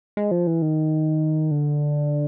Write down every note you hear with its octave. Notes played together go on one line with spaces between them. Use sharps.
G#3
F3
E3
D#3
D3